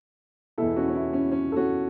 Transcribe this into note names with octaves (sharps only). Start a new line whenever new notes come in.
E2 B2 E4 A4
C#4 F#4
C#4
E4
C#4
C#4
A4
C#4 F#4